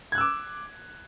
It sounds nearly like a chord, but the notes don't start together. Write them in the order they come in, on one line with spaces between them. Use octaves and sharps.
G#6 F#6 E6 D6